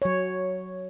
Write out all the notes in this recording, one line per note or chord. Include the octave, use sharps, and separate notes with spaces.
F#3 C#5